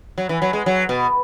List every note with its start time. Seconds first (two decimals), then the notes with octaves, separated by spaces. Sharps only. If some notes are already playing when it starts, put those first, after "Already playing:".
0.18 F#3
0.29 E3
0.42 F#3
0.53 G#3
0.66 F#3
0.89 B2